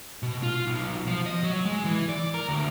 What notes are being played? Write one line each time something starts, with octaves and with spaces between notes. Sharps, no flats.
B2
F4
B1
F3
D#5
F#3
G#3
E3
D5
A#4
D2